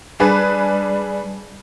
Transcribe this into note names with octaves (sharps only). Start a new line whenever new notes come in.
G3 D4 G#4 B4